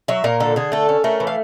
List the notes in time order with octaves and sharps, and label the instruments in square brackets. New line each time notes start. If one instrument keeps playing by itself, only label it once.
[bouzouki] F#3 E5
A#2 A#4
D3 A4
D3 G#4
A3 A4
C#4
A3 A#4
E3
F5